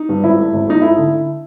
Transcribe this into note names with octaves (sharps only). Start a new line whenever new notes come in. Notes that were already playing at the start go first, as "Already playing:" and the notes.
Already playing: D#4
G2
G#1 E4
A3
G#1
A3 D#4
A3 E4
D3